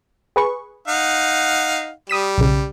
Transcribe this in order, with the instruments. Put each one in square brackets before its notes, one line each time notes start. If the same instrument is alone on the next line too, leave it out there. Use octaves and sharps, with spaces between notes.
[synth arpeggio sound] G#4 B4 C#6
[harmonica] D#4 F5 F#5
[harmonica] G3 [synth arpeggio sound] D#6 B6 E7
[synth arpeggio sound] B1 C#3